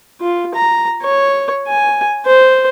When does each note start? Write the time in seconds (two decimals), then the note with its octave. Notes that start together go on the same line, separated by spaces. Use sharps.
0.22 F4
0.55 A#5
1.03 C#5
1.67 G#5
2.26 C5